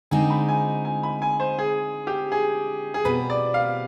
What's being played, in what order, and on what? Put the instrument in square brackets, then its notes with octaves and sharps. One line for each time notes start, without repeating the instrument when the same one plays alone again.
[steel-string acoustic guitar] D3 G#3 C4 D#4 [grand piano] G#5
[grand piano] B5
G#5
G#5
B5
G#5
C5
G#4
G4
G#4
G#4
[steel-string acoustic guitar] B2 G3 C4 [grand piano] B4
[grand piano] D5
F5